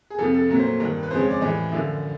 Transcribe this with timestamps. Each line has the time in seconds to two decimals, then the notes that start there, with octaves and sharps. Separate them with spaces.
0.10 G#4
0.18 F2 C3 F3 A4
0.34 A4
0.49 A#2 F#3 A3 A#4
0.59 C5
0.80 G2 D#3 G3
1.03 B4
1.10 F2 C#3 F3 G#3 C5
1.21 C#5
1.30 D5
1.41 A2 E3 G3 D#5
1.72 F#2 D3 F3 E5